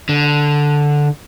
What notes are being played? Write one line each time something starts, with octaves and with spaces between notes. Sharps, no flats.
D3